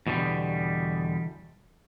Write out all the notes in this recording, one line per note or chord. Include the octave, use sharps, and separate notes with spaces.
E2 B2 D3 G3